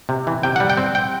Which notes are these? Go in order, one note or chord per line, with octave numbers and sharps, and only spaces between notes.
C3
E3
C3 G5
G3 F#5
G5
C4
G5